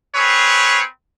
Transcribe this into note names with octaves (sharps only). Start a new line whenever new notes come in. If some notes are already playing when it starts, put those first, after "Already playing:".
C4 G#4 B4 C#5